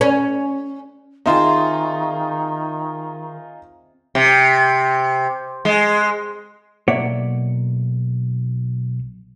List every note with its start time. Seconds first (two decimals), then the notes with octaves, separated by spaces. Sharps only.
0.01 C#4
1.26 D#3 C4 D#4 F4 G#4 E5 C6
4.15 C3
5.65 G#3
6.88 B1 A#3 C#5 D5 E5 F#5